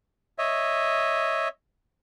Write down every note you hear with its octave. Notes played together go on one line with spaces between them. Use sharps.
C#5 D#5 E5